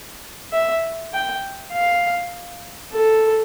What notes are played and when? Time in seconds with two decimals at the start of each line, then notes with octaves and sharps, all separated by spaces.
0.52 E5
1.13 G5
1.72 F5
2.92 A4